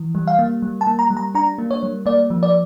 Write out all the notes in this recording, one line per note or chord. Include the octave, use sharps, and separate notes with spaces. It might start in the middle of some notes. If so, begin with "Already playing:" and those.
Already playing: E3
G3
F5
A#3
G3
A5
A#3
A#5
G3
A#5
D4 A#5
A#3
C#5
G3
A#3 D5
F3
D5